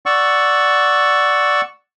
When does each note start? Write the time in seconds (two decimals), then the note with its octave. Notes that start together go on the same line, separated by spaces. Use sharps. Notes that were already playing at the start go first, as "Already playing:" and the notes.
0.06 D5 F#5 C#6 E6